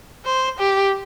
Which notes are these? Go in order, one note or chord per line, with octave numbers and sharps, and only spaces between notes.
C5
G4